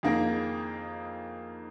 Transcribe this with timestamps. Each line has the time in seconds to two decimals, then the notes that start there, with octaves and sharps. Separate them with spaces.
0.03 F2 D#3 A#3 D#4 G#4